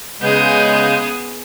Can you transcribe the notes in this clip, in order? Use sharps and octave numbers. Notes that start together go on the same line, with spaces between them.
C#3 G#3 B3 G#4 G6